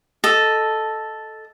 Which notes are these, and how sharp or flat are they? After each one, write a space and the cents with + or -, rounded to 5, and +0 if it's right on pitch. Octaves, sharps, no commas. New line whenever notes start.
A4 -5 D#5 +0